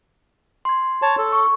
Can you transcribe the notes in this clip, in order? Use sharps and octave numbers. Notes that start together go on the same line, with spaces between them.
C6 G#6
C#5 A5
A4
C#6